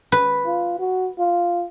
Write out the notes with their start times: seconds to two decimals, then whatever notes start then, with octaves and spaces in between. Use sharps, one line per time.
0.12 B4
0.46 F4
0.79 F#4
1.19 F4